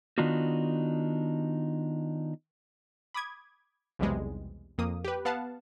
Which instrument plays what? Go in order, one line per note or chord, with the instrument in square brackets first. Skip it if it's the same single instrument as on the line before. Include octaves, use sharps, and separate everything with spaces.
[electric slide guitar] D#3 B3 D4 D#4 F4 F#4
[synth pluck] B5 D6 D#6 G#6
B1 E2 C3 G3 G#3
F2 A#3 D#6
G4 B4
B3 F5 F#5 A5